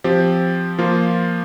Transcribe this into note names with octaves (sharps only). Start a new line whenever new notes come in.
F3 C4 G4
F3 A#3 F4